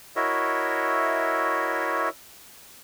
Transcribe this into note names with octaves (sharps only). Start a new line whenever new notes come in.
E4 F#4 A#4 C#5 D#5 E5